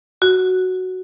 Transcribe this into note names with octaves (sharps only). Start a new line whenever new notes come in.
F#4